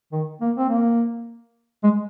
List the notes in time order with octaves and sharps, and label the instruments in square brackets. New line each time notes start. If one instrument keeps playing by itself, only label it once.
[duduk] D#3
A#3
C4
A#3
G#3